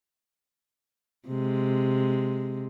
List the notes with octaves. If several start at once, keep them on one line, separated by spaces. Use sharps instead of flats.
C3 G#3